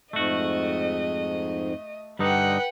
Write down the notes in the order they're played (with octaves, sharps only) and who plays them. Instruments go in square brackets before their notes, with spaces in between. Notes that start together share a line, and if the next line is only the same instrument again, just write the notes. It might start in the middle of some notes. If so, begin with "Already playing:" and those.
[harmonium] F2 G#2 [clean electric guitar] A3 F#4 [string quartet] D#5
[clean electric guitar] G2 D3 D#4 [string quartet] B4 F#5 G5